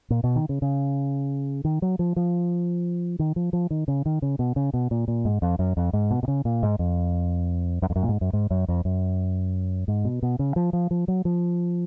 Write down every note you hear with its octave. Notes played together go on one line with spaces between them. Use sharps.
A#2
B2
D#3
C#3
C#3
D#3
F#3
F3
F3
D#3
F3
F3
D#3
C#3
D#3
C#3
B2
C#3
B2
A#2
A#2
G#2
F2
F#2
F2
G#2
B2
B2
C#3
A#2
G#2
F2
F#2
F2
F#2
A#2
G#2
F#2
G#2
F#2
F2
F#2
G#2
B2
B2
C#3
F3
F3
F3
F#3
F3